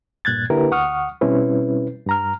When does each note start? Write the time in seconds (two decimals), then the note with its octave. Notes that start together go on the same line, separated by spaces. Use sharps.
0.25 G2 A#2 F#6 G#6 A6
0.50 D3 A#3 E4 G4 A#4 B4
0.71 D2 F#5 C#6 D#6 F6
1.21 B2 G3 C4 C#4 E4 B4
2.07 G2 A#5 F6